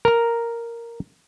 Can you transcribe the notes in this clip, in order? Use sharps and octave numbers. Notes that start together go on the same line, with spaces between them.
A#4 A#5